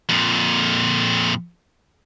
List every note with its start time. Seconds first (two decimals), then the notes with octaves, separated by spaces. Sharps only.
0.09 F2 A#2